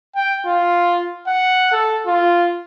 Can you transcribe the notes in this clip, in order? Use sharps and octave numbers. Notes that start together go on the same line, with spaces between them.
G5
F4
F#5
A4
F4